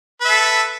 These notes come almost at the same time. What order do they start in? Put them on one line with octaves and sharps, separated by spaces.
B4 E5 A4